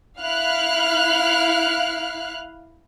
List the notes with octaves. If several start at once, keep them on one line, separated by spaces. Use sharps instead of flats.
E4 F5 F6 F#6